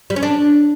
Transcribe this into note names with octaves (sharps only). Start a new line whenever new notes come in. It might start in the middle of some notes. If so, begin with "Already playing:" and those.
G3
C#4
D4